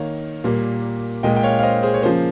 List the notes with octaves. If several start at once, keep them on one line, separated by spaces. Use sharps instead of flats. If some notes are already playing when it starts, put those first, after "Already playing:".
Already playing: D#3 A#3 C#5 F5
A#2 G3 A#3
A#2 G#3 D#5 G5
G5
C#5 F5
F5
C5 D#5
G#4 C5
C#5
C#3 F3 A#3 G#4 C5